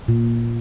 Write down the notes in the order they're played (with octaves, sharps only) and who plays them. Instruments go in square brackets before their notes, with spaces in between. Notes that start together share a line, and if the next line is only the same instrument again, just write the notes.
[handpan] A#2